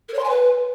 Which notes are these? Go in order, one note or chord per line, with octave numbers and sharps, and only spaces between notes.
A#4
C#5
C6
G#5
B4